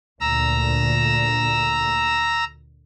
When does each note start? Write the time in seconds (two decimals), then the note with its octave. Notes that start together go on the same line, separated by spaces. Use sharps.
0.21 D2 A#2 A#5 E6